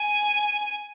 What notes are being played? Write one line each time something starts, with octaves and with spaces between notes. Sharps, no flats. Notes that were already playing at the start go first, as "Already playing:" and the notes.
Already playing: G#5